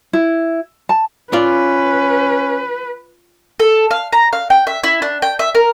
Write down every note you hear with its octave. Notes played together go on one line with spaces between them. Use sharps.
E4
A5
C#4 F4 B4 D5
A4
F5
A#5
F5
G5
E5
E4
D4
G5
E5
A#4